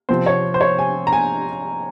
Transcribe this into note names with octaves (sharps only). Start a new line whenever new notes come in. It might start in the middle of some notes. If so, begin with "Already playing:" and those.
C3 F3 C4 C5
C#5
C5
C#5
G#5
A#5
G#5